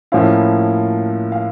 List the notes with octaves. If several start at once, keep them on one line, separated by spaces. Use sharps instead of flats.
A2 F3 A#3 C#4 E4 F5
F5